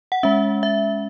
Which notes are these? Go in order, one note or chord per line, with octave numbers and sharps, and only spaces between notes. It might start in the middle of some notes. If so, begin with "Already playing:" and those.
F#5
G#3 C#4 E5
E5